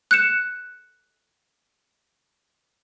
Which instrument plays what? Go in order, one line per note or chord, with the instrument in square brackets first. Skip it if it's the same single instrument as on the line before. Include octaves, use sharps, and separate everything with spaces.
[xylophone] F#6 G6 C#7 E7